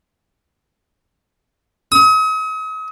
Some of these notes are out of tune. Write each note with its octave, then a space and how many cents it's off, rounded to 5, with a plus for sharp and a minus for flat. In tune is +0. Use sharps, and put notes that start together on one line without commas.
D#6 +40